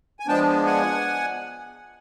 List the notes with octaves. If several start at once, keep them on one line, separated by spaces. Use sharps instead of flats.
G#5
F3 G#3 B3 D4 G5 A5
F#5 G#5